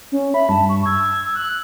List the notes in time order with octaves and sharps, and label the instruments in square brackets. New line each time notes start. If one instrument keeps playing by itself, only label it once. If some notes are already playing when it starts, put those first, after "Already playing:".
[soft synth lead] C#4
[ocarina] E5 [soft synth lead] B5
[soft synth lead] G2 [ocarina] A5
[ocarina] C#6
[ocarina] E6 [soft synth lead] G#6
[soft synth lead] F#6